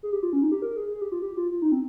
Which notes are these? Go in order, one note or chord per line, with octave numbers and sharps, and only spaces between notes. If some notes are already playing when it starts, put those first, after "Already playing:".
G#4
G4
F4
C#4
D#4
G4
A#4
G#4
G#4
G4
F4
G4
F4
F4
D#4
C4